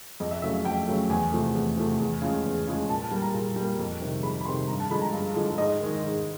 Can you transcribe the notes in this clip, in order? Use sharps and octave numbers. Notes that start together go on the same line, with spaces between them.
F2 D#5
E5
C#3 F#3 A3 E5
F5
F2 G5
C#3 F#3 A3
E2 G#5
C3 F3 A3
E2
C3 F3 A3
E2
C#3 F3 G#3
E2
C#3 F3 G#3
A#2 A5
A5
G3 A#3
A#5
A#2
G3 A#3
F2
C3 D#3
F2 B5
B5
C3 D#3 C6
G2 A#5
A5
D3 F3 G#3 B5
A#5
G2 F5
D3 F3 G#3
G#2 D#5
D#3 G#3
G#2